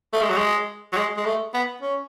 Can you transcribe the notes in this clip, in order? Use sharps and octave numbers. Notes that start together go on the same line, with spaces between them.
A3
G#3
F#3
G#3
F#3
G#3
G#3
A3
B3
C#4